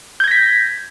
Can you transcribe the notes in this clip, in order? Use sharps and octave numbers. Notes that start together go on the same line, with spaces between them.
G6 G#6 A#6 B6